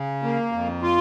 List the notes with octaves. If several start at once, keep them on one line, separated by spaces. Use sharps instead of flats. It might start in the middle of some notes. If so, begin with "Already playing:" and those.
Already playing: C#3
A#3
F2
F4